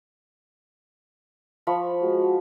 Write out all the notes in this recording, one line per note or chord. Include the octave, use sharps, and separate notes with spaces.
F3 B5 C#6
G#3 F#4